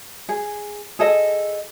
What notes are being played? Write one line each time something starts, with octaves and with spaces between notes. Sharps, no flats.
G#4
G#4 A4 D#5